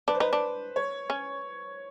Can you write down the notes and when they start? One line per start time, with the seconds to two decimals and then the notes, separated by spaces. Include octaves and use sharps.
0.08 D4 B4
0.15 C5
0.20 D#4 B4
0.33 D4
0.76 C#5
1.10 C#4